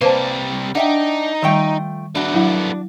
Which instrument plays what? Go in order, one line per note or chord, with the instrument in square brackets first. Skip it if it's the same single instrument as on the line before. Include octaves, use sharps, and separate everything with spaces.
[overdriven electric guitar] C3 G3 [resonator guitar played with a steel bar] A#3 [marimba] B4 C5 A5
[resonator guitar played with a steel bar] D4 E5 G5 [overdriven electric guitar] D#4 [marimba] F#5
[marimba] D#3 G3 [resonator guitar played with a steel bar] F3 A3 G5
[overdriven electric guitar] A3 B3 [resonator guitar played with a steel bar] D4 F#4
[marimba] F#3 E4 F#5